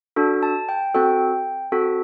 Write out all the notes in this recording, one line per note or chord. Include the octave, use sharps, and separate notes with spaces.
D4 F#4 A4
A5
G5
C4 F#4 A4 G5
C4 F#4 A4